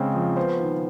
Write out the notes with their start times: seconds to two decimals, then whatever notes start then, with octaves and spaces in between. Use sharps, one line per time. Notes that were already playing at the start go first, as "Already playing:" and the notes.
Already playing: C#3 G#3 C4 C5
0.14 F3
0.36 B3 C5
0.60 D#3